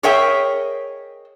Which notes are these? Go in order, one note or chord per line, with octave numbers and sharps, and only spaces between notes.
G#4 A#4 C#5 D#5 E5 G5